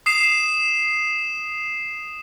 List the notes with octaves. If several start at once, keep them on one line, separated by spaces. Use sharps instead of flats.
D#6 C7 E7